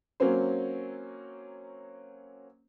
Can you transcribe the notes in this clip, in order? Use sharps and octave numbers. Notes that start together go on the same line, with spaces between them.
F#3 A#3 C4 C#4 C5